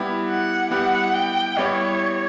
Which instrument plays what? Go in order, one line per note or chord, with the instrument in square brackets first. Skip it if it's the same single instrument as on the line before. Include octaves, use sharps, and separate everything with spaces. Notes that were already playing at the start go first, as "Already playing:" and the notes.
Already playing: [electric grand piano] G3 B3 E4 G4
[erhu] F#5
[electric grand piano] G3 B3 E4 G4 [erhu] F#5
[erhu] G5
[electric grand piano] G3 B3 E4 G4 [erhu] C#5